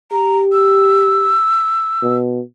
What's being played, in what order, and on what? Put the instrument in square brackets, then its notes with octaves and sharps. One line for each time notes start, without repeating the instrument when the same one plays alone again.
[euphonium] G4 [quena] A#5
[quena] E6
[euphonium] B2